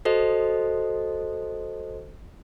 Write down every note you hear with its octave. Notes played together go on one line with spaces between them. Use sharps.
F#4 A4 C5 D#5